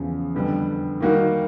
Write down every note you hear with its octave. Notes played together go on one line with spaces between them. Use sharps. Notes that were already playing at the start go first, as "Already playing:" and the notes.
Already playing: E2 C#3 F3
F2 D3 G3 B3
D#3 G3 A#3 D#4 F#4